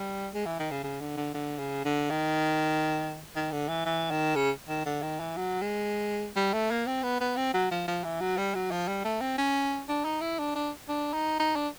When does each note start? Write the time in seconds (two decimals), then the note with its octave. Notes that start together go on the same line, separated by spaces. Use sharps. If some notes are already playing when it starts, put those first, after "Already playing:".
Already playing: G3
0.34 G#3
0.46 E3
0.59 D#3
0.71 C#3
0.84 C#3
1.01 D3
1.17 D3
1.34 D3
1.59 C#3
1.85 D3
2.10 D#3
3.36 D#3
3.52 D3
3.68 E3
3.86 E3
4.11 D#3
4.35 C#3
4.69 D#3
4.85 D3
5.02 D#3
5.20 E3
5.36 F#3
5.61 G#3
6.36 G3
6.53 A3
6.71 A#3
6.87 C4
7.03 B3
7.21 B3
7.37 C4
7.54 F#3
7.71 F3
7.88 F3
8.04 E3
8.21 F#3
8.37 G3
8.55 F#3
8.71 F3
8.88 G3
9.04 A3
9.21 C4
9.38 C#4
9.89 D4
10.05 D#4
10.21 E4
10.39 D4
10.56 D4
10.89 D4
11.13 D#4
11.40 D#4
11.56 D4